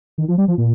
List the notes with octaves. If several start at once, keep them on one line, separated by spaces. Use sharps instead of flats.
D#3
F3
G3
F3
A#2